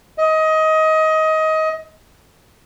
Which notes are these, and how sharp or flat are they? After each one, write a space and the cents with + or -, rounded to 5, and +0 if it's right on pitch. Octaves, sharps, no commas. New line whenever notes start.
D#5 +20